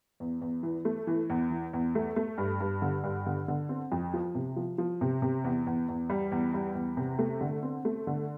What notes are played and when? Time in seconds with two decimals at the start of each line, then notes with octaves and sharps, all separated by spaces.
0.20 E2
0.42 E2
0.63 E3
0.85 A3
1.07 E3
1.30 E2
1.51 E3
1.73 E2
1.95 A3
2.16 A3
2.38 G2
2.60 G2
2.82 D3
3.04 G2
3.26 D3
3.48 D3
3.69 C4
3.92 F2
4.14 F3
4.35 C3
4.56 F3
4.78 F3
5.01 C3
5.22 C3
5.44 E2
5.67 E2
5.89 E2
6.10 G3
6.32 E2
6.54 G3
6.75 E2
6.97 C3
7.19 A3
7.41 D3
7.63 C4
7.85 A3
8.07 D3